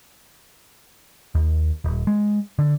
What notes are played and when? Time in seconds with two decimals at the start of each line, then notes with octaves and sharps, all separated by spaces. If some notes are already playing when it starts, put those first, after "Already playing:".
1.35 D#2
1.84 D#1
2.07 G#3
2.59 D3